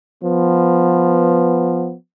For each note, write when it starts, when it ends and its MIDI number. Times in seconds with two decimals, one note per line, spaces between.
0.23 1.94 53
0.23 1.94 59